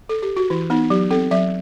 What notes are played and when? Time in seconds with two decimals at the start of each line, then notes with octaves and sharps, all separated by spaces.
0.09 A4
0.22 G4
0.37 F#4
0.50 E3 E4
0.70 B3 D#4
0.90 F#3 G4
1.11 C4 A4
1.31 F#3 E5